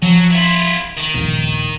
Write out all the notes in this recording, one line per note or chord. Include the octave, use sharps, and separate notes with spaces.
F3 F#3
E4 F4
D#3
A#1 D#2